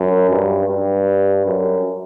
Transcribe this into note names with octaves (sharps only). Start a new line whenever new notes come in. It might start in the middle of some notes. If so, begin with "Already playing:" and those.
Already playing: F#2
G2
G2
F#2